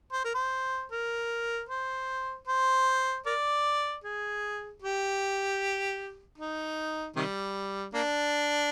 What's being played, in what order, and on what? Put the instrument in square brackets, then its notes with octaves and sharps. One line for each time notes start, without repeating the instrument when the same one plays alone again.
[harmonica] C5
A#4
C5
A#4
C5
C5
A#4 D5
G#4
G4
D#4
C3 D#3 G3
A#3 D4